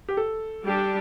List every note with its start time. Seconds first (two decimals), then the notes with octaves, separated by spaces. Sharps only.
0.09 G4
0.17 A4
0.63 G3 D4 G4